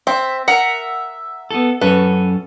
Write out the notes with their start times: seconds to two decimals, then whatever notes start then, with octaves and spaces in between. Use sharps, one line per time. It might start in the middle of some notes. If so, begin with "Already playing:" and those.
0.07 C4 E5
0.48 A#4 E5 F#5 A#5
1.51 B3 A4
1.81 F#2 C#4 A4 B4